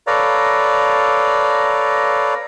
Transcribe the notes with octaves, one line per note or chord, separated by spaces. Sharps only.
A4 B4 C#5 D5 F5 A#5